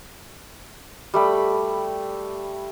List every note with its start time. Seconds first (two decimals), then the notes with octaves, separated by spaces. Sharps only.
1.14 G3 A3 B5